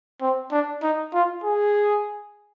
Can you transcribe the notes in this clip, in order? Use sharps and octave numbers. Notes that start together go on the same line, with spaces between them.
C4
D4
D#4
F4
G#4